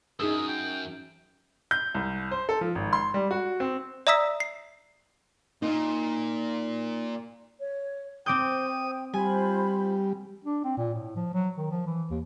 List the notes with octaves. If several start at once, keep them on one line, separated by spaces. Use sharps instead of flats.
F#2 D#4 G#4 D#6 E6
G5
G6
C2
C5
A4
F3
G#1
C6
G3
F#4
C4
D5 E5 A#5 D#6 E6 B6
C7
A#2 D#4
C#5
C4 C5 G5 D6 D#6 G6
G3 F4 C5 G#5 B5
D4
C4
A#2
A2
F3
F#3
D#3
F3
E3
D#2